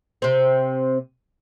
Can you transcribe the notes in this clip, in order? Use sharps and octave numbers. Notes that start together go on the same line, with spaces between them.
C3 C4